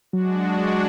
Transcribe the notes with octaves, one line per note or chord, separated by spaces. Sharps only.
F#3 G#3 D4 F#4